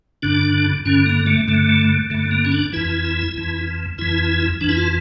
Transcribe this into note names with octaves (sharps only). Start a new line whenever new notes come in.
G2 D3 D4
G2 D3 C#4
A#3
A3
G2 D3 A3
G2 D3 A3
A#3
C#4
D4
F2 E3 E4
F2 E3
F2 E3 E4
F2 E3 D4
E4
F4